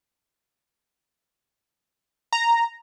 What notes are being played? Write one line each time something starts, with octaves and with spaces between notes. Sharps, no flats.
A#5